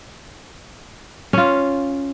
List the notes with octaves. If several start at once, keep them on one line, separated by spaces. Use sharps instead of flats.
C#4 F4